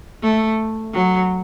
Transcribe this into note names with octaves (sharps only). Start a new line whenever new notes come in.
A3
F#3